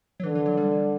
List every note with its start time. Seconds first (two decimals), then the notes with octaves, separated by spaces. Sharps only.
0.20 F#3
0.23 D3 E3
0.35 E3
0.46 F#3
0.57 G3